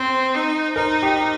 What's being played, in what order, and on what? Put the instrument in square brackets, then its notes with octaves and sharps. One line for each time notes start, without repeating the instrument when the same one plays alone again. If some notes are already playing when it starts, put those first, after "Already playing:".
Already playing: [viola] C4 [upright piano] C5
[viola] D#4
[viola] D#4 [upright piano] A#4
[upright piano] G4